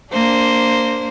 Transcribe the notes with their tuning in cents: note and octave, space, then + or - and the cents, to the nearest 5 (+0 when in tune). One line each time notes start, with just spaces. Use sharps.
A#3 -10 D4 -15 C5 +0